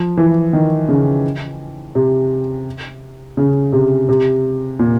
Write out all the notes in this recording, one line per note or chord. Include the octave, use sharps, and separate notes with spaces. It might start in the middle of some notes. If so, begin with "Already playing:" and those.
Already playing: F3
E3
D#3
C#3
C3
C#3
C3
C3
A#2